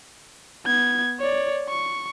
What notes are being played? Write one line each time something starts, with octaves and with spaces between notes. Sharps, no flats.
B3 G#6
C#5 D5
C#6